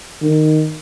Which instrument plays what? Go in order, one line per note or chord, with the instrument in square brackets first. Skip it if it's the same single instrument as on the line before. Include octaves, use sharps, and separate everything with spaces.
[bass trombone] D#3